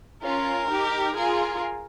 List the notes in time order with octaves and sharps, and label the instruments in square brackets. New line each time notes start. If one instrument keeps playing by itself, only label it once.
[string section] C#4 F4 [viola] A#4
[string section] D#4 G4
[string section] F4 G#4 [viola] A#4